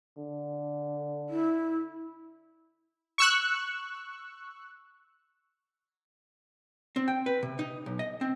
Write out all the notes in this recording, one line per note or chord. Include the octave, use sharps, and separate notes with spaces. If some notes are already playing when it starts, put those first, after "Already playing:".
D3
E4
C#6 E6 F#6
C4
G5
B4
C3
D#4
B1
D#5
C4